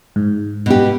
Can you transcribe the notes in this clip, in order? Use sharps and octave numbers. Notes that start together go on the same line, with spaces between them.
G#2
B2 G4